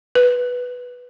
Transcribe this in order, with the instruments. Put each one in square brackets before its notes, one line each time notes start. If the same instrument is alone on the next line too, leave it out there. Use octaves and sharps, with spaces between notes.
[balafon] B4